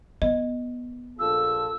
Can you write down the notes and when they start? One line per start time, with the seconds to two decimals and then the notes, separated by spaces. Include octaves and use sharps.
0.22 B3 D#5
1.19 A#1 F4 A4 E6